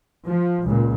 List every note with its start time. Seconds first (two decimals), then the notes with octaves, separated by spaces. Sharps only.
0.25 F3
0.64 C#2 A#2